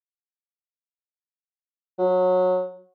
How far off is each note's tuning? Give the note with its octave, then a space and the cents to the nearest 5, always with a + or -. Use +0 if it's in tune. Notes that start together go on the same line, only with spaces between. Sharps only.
F#3 -20